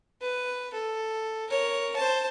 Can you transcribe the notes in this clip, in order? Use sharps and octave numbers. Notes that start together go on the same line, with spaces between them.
B4
A4
A#4 C#5
C5 A5